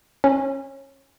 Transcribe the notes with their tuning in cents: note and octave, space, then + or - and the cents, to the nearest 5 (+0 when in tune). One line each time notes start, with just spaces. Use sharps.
C#4 -25